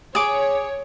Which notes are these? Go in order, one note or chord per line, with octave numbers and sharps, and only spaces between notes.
G#4 C#5 D6